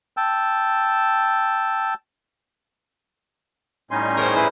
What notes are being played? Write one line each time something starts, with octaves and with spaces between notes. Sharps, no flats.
G5 A5 E6
A2 G3 C#4 D#4 G#5 C6
G#4 A#4 C5 C#5 G5
E4 G#4 B4 C5